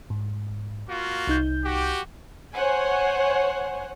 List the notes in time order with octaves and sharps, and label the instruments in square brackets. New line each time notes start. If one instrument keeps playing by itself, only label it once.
[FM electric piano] G#2
[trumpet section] A#3 F4 F#4
[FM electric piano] C2 D#4 G6
[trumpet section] F#4 G4
[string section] C5 C#5 F#5 G#5